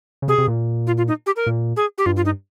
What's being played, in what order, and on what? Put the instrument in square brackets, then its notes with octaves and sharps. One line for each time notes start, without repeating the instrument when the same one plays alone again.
[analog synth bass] C#3
[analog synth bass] C3 [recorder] G#4
[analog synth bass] C3
A#2
[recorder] F4
F4
D#4
G4
A#4
[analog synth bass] A#2
[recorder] G#4
G4
[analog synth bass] G2 [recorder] F4
[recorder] F4
D#4